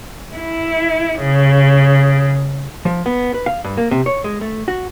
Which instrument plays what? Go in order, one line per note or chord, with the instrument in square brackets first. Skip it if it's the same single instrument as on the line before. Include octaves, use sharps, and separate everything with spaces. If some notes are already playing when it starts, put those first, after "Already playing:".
[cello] E4
C#3
[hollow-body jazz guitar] F3
B3
B4
F5
G2
A#3
C3
C#5
G#3
A3
F#4